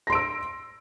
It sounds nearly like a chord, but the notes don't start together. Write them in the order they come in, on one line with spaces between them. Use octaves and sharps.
A#6 C6 D7 E6